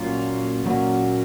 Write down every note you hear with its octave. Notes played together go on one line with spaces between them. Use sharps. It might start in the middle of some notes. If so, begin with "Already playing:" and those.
Already playing: A#2 F#3 A#3 C#4 F4
A#2 F#3 A#3 C#4